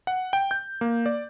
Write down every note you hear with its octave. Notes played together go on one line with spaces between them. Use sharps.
F#5
G5
G6
A#3
D5